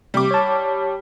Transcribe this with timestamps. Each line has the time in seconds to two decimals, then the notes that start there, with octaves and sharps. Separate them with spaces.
0.14 C3 G3 D6
0.31 C#5 A5